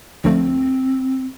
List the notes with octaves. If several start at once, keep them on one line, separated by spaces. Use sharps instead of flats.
D2 F3 A3 C4